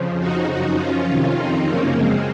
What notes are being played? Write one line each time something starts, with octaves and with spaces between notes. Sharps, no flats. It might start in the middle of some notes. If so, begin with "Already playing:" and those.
Already playing: F2 C#3 F3
D#4 F#4
F#2 F3 D#4 F#4
C#4 F4
F2 C3 D#3
C4 D#4
F#2 C#3 F3 A#3 C#4
G#3 C4